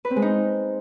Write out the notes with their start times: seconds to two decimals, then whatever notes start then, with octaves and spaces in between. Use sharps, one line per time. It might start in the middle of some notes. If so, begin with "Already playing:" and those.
0.05 B4
0.11 C4
0.16 G#3
0.22 D#4